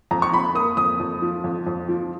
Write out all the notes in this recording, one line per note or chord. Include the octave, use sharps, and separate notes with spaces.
F2 A#5
C#6
F2 B5
A#3 D#6
F2 D#6
F2
F3
F2
F2
F3